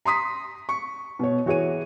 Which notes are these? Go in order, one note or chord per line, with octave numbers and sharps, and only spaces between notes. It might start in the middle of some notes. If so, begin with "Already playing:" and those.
A#5 C6 D#6 B6
C#6
B2 C#5
E3 F#4 G#4 C#5 D#7